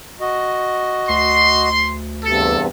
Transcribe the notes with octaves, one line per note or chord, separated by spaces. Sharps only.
F#4 D#5
D2 C6
E2 G2 C3 A4